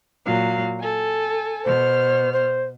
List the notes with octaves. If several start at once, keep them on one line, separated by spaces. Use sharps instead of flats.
A#2 F#3 F5
A4 G#5
B2 C5 F6
C5